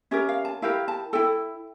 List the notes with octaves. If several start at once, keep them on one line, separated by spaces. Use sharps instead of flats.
C#4 G4 A#4 E5
F5
A5
E4 G4 A#4 F5
A5
E4 A4 G5